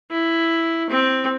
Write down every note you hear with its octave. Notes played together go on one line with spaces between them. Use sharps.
E4
C4